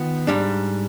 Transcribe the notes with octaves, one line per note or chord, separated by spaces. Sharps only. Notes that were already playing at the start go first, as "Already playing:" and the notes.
Already playing: D#3 B3 F4
G#2 G3 D4